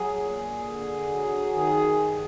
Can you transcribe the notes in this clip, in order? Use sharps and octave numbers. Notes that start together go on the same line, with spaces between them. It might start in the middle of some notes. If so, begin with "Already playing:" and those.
Already playing: F#3 G#4
A#2
D3
F#3
D#3 G#4
G2